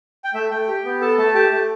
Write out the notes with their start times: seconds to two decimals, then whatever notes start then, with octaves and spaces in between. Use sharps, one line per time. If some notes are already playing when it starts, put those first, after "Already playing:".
0.24 G5
0.34 A3 E5
0.51 A3 G5
0.68 G4
0.85 B3
1.01 A4 A5
1.18 A3 A5
1.34 G4 A5
1.52 A3